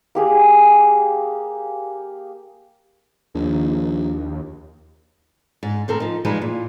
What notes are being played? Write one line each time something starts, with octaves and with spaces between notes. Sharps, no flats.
A#3 G4 G#4
A#1 D#2
G#2
A2 C4 A4 A#4
F3 D#4
E3 F3 G3 G#3 D#4
A#2